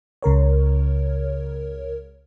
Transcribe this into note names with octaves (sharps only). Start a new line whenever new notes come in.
C#2 C#3 A#4 C#5